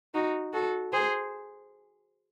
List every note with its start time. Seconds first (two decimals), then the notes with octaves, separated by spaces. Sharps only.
0.14 D#4 F#4
0.53 F#4 A4
0.93 G#4 C5